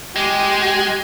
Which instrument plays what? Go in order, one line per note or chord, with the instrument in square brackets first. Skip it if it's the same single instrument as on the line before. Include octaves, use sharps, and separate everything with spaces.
[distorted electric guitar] G#3 [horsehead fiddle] G4